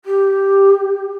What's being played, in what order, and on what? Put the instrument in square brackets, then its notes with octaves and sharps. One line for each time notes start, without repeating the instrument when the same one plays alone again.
[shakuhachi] G4